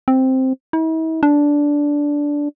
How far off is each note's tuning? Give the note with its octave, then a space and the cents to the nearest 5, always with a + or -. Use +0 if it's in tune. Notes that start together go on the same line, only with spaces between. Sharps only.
C4 +0
E4 -45
D4 -10